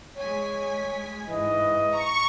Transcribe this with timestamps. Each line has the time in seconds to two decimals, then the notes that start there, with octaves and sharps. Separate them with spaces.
0.17 G#3 C#5 G#5 B6
1.28 G#2 E3 D#5
1.92 A#5 C#6